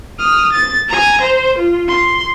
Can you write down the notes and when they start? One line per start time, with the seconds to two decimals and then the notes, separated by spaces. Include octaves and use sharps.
0.19 D#6 F6
0.53 A6
0.88 G#5 A#5
1.21 C5
1.58 F4
1.88 C6